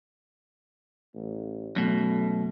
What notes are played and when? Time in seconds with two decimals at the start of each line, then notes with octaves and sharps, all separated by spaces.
1.14 A1
1.76 F#2 B2 A3